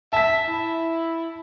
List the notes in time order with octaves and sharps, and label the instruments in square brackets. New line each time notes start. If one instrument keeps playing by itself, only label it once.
[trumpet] E5 [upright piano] A5 B6
[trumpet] E4